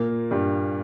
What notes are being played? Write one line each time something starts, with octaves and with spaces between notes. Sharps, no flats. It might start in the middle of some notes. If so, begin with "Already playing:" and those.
Already playing: A#2 A#3
G2 G3